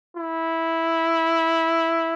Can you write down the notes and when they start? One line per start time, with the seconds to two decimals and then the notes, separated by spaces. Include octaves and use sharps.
0.17 E4